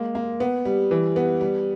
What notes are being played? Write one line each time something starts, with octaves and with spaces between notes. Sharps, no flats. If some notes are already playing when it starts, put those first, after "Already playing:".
Already playing: G#3 A#3
A#3
B3
G3
E3
B3
G3